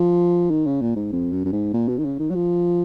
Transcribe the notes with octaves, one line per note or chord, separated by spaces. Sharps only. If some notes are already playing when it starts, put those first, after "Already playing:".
Already playing: F3
D#3
C#3
A#2
G#2
F2
F#2
F#2
G#2
A#2
B2
D#3
C#3
D#3
F#3
F3